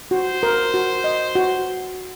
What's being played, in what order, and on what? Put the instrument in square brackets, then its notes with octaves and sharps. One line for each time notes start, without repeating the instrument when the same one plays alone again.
[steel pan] F#4 [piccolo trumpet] C5
[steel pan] A#4
F#4
D#5
F#4